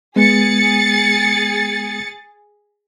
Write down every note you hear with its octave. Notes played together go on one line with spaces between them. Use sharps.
G#3 B3 G#4 A6 C#7